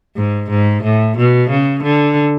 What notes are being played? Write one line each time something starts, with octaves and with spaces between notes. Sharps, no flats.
G#2
G#2
A2
B2
C#3
D3